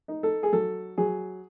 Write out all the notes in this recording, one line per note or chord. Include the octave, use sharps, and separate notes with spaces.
D#4
A4
G#4
F#3 A4
F#3 G#4